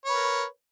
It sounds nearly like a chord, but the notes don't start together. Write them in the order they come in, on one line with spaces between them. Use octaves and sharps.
C#5 B4 A#4